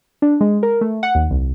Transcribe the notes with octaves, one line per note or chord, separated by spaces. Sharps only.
D4
G#3
A#4
A3
F#5
D#2
C2